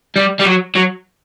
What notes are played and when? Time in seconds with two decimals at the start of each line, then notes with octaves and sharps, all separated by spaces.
0.16 G3
0.39 G3
0.46 F#3
0.76 F#3